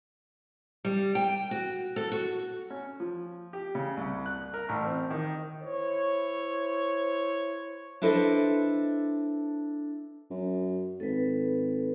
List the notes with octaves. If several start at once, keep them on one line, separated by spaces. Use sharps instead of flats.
G3
G5
F#4
A4
F#4
C#4
F3
G4
C#3
C2
F#6
A#4
A1
C4
D#3
E4 C5 C#5
D4 E4 A4 B4 C5 D#5
F#2
G#1 A4 B4